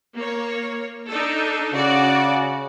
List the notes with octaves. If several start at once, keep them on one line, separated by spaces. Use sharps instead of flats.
A#3 C#5
D4 D#4 A4
C#3 F#4 D5